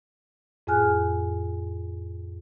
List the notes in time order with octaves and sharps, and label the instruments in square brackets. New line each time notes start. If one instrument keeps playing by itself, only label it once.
[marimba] F2 A2 G#4 G#5 F6 F#6